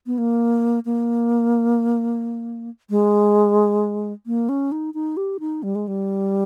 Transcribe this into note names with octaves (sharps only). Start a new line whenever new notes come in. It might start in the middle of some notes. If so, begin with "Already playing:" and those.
B3
A#3
A#3
G#3
A#3
C#4
D#4
D#4
G4
D#4
G3
G#3
G3